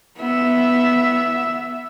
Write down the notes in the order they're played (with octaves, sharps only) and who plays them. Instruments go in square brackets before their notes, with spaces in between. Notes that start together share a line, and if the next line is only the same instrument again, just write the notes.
[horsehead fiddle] B3 E5